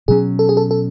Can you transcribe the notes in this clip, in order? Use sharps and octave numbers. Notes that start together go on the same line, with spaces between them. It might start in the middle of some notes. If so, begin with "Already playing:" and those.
B2 F#3 C#4 G#4
A4
G#4
A4
A4